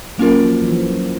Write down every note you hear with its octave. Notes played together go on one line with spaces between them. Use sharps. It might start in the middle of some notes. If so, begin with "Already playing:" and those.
F#3 A#3 C#4 F4 A#4
F3
E3
F3
F#3